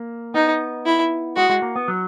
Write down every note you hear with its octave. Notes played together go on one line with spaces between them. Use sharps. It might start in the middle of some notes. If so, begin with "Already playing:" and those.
Already playing: A#3
B3 D#4
E4
G#3 F#4
G#3
A#3
B3
F#3